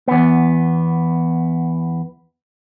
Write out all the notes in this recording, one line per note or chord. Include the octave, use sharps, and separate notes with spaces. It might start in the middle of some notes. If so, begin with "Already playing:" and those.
E2 B3